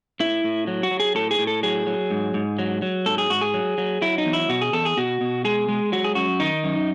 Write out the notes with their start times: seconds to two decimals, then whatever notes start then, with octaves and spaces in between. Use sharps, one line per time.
0.20 A2 E4
0.44 A2
0.67 F#3
0.83 F#4
0.91 F#3
1.00 G#4
1.15 A2 A4
1.31 G#4
1.39 A2
1.47 A4
1.63 F#3 G#4
1.87 F#3
2.11 G#2
2.34 G#2
2.59 F#3
2.82 F#3
3.06 G#2 A4
3.18 G#4
3.30 G#2 F#4
3.41 G#4
3.54 F#3
3.78 F#3
4.02 F#3 E4
4.18 D#4
4.26 E2
4.33 E4
4.49 B2 F#4
4.61 G#4
4.73 E2 A4
4.85 G#4
4.97 B2 F#4
5.21 B2
5.45 G#3 G#4
5.69 G#3
5.92 F#3 F#4
6.04 G#4
6.15 F#2 F#4
6.40 D#3 D#4
6.64 F#2